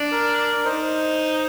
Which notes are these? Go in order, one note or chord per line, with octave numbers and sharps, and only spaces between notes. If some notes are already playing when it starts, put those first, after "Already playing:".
Already playing: D4
A#4
D#4 C5